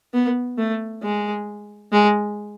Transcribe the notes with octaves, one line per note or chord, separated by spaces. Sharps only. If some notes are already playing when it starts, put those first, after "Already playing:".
B3
A3
G#3
G#3